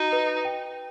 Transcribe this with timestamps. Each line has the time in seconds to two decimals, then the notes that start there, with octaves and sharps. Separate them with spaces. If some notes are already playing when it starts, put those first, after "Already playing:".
Already playing: D#4 F#4
0.12 B4
0.45 G5